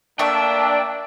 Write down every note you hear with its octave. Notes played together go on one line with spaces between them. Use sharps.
A3 A#3 D4 E5 G5